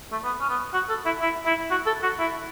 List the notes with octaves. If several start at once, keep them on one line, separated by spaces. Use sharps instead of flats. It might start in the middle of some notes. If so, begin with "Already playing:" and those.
A3
B3
C#4
B3
F#4
A4
E4
E4
E4
F#4
A4
F#4
E4